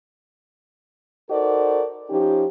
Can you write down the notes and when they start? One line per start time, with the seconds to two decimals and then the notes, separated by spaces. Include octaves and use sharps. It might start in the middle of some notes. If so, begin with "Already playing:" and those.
1.30 D#4 F#4 A4 A#4 C5 D5
2.10 F3 C#4 D#4 G4